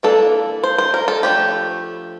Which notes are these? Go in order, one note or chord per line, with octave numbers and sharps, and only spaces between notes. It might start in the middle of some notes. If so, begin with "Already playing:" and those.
E3 A#3 D4 A4
C5
C5
A#4
A4
F3 A3 D4 G4